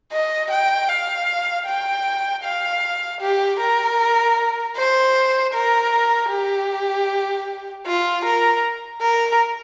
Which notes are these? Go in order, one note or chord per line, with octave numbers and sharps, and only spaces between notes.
D#5
G5
F5
G5
F5
G4
A#4
C5
A#4
G4
F4
A#4
A#4